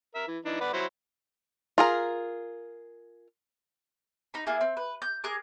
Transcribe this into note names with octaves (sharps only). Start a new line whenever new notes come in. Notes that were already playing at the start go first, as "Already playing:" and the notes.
A#4 E5
E3
E3 D4 D#4
B4 D5 F#5
F#3 E4 C5
F4 G#4 A#4
D#4 B5
A#3 D4 E4 G#4
C4
B4
G6
G#4 A#4 D6 F#6